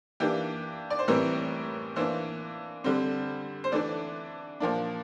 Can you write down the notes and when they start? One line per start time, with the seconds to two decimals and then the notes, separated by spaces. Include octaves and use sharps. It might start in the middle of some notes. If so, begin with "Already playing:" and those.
0.20 E3 A#3 D4 G4
0.90 D5
0.99 C5
1.08 A2 E3 G3 C4 A#4
1.96 E3 A#3 D4 C5
2.84 D3 G3 C4
3.64 C5
3.72 E3 A3 D4 D5
4.60 A#2 F3 A#3 D4